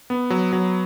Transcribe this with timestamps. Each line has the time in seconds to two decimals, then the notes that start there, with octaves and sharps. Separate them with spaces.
0.10 B3
0.30 F#3
0.53 F#3